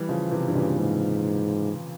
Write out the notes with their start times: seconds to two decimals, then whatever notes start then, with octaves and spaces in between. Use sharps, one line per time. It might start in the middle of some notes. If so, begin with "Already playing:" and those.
Already playing: E3 G3
0.09 C#3 F3
0.31 C3 E3
0.47 G2 E3
0.55 A#2 C#3
0.78 G#2